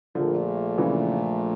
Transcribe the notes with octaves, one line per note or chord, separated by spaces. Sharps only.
A#1 A#2 D3 F3 A3
C#3 E3